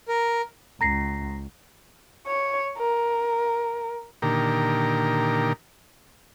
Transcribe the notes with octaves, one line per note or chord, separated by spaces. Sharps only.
A#4
C#2 A#5 A#6 C7
C#5
A#4
A#2 D3 D#3 G4 A#4